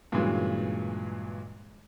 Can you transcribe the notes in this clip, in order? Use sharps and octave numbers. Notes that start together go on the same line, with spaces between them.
G2 A#2 C#3 E3 F#3 G#3